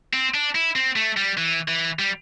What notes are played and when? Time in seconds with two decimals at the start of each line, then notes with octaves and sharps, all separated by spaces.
0.13 C4
0.34 D4
0.55 E4
0.76 C4
0.96 A3
1.17 G3
1.37 E3
1.68 E3
1.99 G3